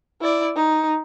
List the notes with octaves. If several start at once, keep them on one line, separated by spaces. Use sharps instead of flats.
E4 D5
D#4